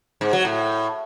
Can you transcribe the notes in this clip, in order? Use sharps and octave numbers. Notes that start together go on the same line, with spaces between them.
G#2
F#3
A2